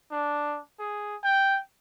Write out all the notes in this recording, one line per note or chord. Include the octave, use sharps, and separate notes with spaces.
D4
G#4
G5